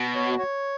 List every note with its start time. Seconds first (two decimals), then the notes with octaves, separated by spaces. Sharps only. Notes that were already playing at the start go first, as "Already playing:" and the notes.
Already playing: B2 F#4
0.15 C#5
0.39 C#5